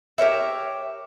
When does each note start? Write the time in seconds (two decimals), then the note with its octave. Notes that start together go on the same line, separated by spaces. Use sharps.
0.18 G4 A#4 C#5 E5